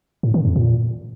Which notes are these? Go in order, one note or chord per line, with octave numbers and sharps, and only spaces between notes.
A2
D#3
F2
A#2